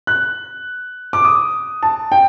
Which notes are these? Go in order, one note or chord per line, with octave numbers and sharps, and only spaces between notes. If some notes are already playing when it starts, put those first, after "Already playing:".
F#6
D6
D#6
A5
G5